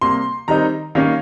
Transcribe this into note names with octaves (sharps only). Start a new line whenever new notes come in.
C3 G3 A#3 C6
D#3 G3 C4 D#4 A#5
D#3 G3 A#3 C#4 F5